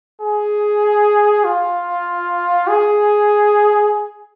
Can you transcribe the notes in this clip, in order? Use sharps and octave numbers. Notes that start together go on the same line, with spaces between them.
G#4
F4
G#4